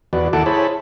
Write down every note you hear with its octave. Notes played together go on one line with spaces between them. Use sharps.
E2 F#4 B4 D5
D#2 E4 A4 F#5 A5 D6
E4 G#4 C5 C#5 A5 B5